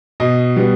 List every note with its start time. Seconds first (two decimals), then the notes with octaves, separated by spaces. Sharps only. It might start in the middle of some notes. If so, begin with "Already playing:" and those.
0.20 B2 D#5
0.56 G3 B3